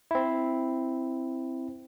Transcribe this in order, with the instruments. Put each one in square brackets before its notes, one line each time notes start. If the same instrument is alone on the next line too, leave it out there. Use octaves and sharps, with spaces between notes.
[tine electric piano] C4 E4